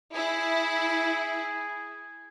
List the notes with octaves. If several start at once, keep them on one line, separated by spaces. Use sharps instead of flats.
E4 G#4